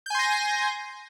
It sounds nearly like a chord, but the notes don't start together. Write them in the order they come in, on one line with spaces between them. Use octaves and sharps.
G6 G#5 C6 A#6